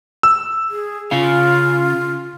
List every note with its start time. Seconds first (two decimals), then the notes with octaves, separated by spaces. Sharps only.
0.23 E6
0.70 G#4
1.11 C#3 C#4 F4 F5